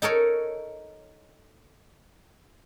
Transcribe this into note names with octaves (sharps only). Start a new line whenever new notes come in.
D#4 A4 A#4 C#5